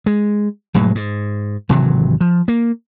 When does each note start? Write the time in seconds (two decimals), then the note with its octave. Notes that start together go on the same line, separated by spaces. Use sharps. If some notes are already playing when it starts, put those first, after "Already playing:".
0.06 G#3
0.74 F1 A2 F#3 G#3
0.95 G#2
1.69 G#1 C3 E3 F#3
2.21 F3
2.48 A#3